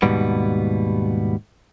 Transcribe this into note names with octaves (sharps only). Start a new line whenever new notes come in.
D#2 G#2 B2 G3 B3